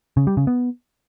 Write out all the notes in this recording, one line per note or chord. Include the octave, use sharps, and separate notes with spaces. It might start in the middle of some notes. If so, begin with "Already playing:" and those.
C#3
G3
C#3
B3